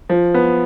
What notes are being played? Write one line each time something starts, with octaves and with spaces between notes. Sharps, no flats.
F3
B3